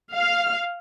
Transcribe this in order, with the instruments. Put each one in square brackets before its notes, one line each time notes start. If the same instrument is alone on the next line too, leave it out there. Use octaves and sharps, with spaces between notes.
[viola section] F5